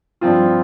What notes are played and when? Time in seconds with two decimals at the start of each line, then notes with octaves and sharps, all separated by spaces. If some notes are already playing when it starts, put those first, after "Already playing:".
0.21 G2 F3 C4 F4